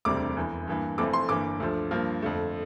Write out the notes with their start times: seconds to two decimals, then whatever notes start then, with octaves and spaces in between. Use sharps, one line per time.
0.05 E1 D2 C3 G3 C4 D6
0.37 F1 E2 E3
0.68 G2 E3 A#3
0.98 F1 F2 E3 A3 C4 D6
1.13 C6
1.29 G1 G2 E3 A#3 D6
1.60 D2 D3 F3
1.91 G2 F3 A#3
2.22 F2 D3 A3